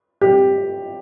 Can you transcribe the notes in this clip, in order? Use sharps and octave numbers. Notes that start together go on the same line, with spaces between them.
G4